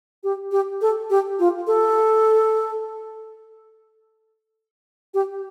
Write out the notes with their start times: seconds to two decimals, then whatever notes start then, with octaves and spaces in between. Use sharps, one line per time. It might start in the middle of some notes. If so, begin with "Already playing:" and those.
0.24 G4
0.52 G4
0.81 A4
1.10 G4
1.39 F4
1.67 A4
5.14 G4